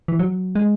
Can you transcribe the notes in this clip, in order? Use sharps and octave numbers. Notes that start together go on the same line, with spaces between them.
E3
F#3
G#3